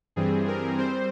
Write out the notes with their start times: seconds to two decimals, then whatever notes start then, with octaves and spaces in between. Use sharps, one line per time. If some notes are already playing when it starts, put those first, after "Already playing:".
0.16 G2 E3 G3 C4 G#4
0.47 A#4
0.78 G3 C4 C5